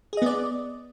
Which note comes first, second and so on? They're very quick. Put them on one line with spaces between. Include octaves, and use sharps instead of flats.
G#4 D#5 B3 D5